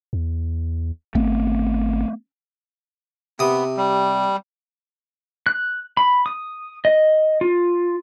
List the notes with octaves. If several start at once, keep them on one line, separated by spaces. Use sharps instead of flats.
E2
G#1 A3 B3 C4
C3 B3 D#6
G3
F#6
B5
D#6
D#5
F4